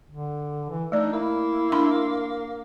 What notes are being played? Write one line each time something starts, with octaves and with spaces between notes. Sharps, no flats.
D3
E3
A3 D4 D#4 D5
A#3 E4
D4 B5 C6